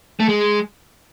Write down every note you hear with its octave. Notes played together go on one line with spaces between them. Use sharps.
A3
G#3